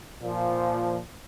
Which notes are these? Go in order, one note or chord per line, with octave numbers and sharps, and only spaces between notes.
A#2 F3